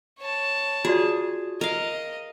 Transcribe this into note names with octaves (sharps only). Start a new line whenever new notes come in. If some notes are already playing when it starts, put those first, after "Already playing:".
C#5 A5
F4 F#4 G#4 D5
A#4 D#5 F5